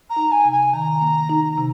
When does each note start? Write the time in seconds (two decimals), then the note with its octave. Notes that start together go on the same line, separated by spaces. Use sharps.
0.09 A#5
0.16 D#4
0.31 G#5
0.45 C3
0.51 G#5
0.73 D#3 A#5
1.01 A#3
1.29 D#4
1.58 C3